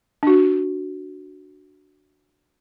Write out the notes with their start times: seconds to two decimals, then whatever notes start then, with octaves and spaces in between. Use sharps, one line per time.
0.23 D4 F#4